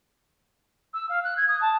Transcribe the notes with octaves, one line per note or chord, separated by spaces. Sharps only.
E6
F5
F#6
G#6
D#6
A5